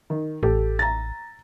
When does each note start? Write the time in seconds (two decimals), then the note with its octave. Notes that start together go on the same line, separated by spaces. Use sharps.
0.10 D#3
0.43 A1 G4 A4
0.79 A#5 A6